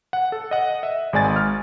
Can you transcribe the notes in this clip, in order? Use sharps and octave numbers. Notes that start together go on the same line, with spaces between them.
F#5
A4
D#5 F#5
E5
G#1 G#3 D5 G#5 A6
F6